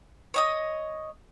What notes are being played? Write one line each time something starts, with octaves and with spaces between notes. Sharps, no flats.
C#5 D#5 D#6